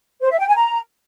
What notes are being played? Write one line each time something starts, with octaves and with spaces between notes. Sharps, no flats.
C5
E5
G5
G#5
A#5